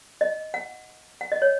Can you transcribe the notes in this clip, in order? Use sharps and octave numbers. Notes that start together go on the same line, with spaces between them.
D#5
F#5
F#5
D#5
C#5